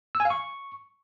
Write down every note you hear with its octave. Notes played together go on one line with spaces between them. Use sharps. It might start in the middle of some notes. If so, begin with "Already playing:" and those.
E6
G#5
F5
C#6